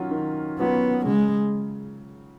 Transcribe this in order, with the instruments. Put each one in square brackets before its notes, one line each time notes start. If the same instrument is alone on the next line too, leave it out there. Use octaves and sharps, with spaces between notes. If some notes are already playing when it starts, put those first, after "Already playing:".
Already playing: [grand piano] D#3 F#3 C#4 F4
D#3
[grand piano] F#3 C#4 F4 [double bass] B3
[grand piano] C#3 [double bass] G#3